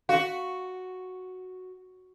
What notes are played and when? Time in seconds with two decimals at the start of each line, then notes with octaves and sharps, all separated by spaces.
0.09 F#4 F5